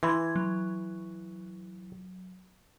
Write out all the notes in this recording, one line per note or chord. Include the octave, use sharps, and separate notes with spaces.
E3 C6 G#6
F#3